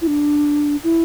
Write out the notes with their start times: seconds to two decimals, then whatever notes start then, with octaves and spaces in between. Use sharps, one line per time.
0.01 E4
0.07 D4
0.84 E4